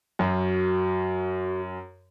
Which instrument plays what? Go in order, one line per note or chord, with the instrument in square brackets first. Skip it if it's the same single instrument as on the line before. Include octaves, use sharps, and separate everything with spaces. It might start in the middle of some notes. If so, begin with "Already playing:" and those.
[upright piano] F#2 [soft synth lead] F#4